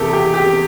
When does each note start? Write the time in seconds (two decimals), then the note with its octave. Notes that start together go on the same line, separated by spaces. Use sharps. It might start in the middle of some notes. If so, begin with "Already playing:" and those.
Already playing: E2 C3 E3 A#3 G4 A4
0.13 G4
0.34 G4